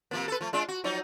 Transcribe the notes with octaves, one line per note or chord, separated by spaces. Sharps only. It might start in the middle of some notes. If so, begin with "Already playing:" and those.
C3 F3 A#3
A4 B4
F3 A3
G#3 D4 F4
F#4
F3 F#3 D#4